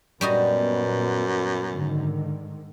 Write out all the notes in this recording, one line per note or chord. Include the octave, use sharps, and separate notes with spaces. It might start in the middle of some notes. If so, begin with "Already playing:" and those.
F#2 A#2 G3 B3 F#4 D#5
G#2 D3 D#3